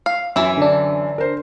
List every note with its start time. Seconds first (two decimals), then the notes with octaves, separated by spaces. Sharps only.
0.06 F5
0.36 F#2 E3 E4
0.57 D3 D4
1.18 A#4 C5